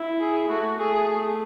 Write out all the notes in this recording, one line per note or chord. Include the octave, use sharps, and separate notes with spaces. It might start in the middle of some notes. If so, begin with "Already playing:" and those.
Already playing: E4
G#4
A3 F#4
A3 G#4